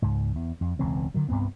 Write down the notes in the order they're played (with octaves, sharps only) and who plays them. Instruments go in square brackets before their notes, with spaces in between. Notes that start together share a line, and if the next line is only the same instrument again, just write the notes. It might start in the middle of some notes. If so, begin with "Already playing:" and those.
[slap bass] C#2 G#2
E2
F2
E1 C#2 E3 C4
D3 D#3 F#3
C2 G2 B3 C4